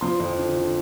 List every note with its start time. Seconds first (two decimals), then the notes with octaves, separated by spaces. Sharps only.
0.01 F3 C6
0.20 F2
0.38 D3
0.56 D3